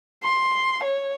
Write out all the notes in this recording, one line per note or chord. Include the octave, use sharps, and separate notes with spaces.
C6
C#5